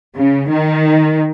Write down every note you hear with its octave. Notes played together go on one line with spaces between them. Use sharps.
C#3
D#3